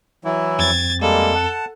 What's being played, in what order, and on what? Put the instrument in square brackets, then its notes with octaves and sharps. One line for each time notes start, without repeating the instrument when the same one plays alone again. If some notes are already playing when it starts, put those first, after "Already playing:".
[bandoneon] E3 F#3 E4
[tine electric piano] F2 C4 [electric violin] G#6 A6
[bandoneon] G3 G#3 A#3 [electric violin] A4
[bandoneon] F#5 A5